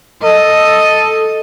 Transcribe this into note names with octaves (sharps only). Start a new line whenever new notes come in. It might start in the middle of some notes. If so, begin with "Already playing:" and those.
A4 D#5